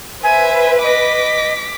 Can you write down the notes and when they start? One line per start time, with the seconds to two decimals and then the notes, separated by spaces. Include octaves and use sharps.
0.23 B4 C5 E5 G#5
0.83 D#5 D6 B6